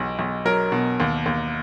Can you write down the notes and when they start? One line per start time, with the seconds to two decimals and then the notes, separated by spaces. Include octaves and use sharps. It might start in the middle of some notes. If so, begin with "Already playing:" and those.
Already playing: B1 B2
0.19 B1
0.45 F#3 A#4
0.72 B2
1.00 D#2
1.26 D#2